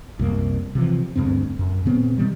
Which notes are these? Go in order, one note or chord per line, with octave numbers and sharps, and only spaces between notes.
C2 F#2 A#3
C3 E3 F3
D2 G2 C#3 C4
F#2
A#2 C#3 B3 C4
B2 D#3 G3